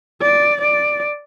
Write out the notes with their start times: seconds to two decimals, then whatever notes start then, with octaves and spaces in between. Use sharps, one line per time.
0.22 D5
0.61 D5